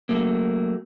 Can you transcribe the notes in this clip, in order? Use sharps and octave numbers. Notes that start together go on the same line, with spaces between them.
F#3 A3 A#3